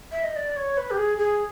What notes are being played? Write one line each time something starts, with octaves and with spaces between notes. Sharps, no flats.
E5
D#5
D5
C#5
B4
G4
G#4
G#4